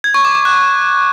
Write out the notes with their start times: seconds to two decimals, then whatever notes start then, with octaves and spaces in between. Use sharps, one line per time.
0.04 G#6
0.14 C#6
0.25 D6
0.35 D6
0.45 F#6